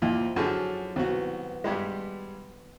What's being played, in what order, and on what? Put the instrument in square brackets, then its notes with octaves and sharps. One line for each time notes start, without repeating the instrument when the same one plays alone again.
[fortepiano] D#2 A#2 [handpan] F3 E4
[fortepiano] F#2 D3 G#4 [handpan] F#3
[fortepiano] C2 F#4 [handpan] D#3 B3
[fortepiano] G2 G3 G#3